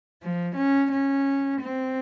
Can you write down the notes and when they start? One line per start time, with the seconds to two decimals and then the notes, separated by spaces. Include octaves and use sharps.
0.23 F3
0.57 C#4
0.92 C#4
1.61 C4